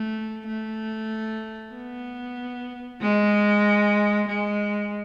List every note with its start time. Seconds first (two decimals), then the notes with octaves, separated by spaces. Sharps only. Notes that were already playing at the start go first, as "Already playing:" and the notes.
Already playing: A3
0.47 A3
1.74 B3
3.01 G#3
4.28 G#3